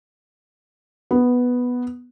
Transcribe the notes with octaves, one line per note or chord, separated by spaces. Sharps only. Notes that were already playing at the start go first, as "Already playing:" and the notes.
B3